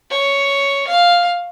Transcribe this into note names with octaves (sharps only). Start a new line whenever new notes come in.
C#5
F5